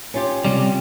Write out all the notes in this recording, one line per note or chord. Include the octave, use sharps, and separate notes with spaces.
C#4 F4 G4
C3 G3